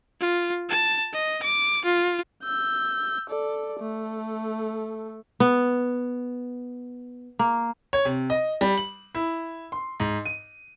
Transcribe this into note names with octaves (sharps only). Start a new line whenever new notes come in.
F4
A5
D#5
D6
F4
E6 G6
A4 D5
A3 A4
B3
A#3
C#5
C3
D#5
G3
F#7
E4
C6
G#2
D#7